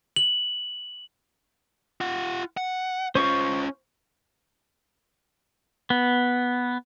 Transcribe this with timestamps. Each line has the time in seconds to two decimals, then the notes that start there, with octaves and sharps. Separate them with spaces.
0.16 F#7
2.01 F4 F#5
2.57 F#5
3.15 C#4 F4 C5 C#6
5.90 B3